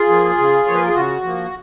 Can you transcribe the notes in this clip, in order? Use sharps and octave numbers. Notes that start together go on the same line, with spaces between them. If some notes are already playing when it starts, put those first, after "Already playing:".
Already playing: F4 G#4
F3 A#3
C#3
F3 A#3 C#5
B4
A#4
G#4
C#3 F#4
F3 A#3